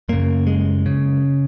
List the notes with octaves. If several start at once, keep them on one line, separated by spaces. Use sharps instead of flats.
F#2 C#3 A#3
G#3
C#3